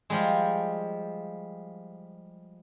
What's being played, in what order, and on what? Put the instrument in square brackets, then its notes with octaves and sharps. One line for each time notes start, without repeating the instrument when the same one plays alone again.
[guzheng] F3 G3 G#3